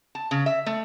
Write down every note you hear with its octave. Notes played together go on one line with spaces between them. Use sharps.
A5
C#3
E5
A3